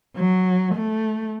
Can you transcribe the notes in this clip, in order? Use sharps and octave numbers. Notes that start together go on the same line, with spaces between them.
F#3
A3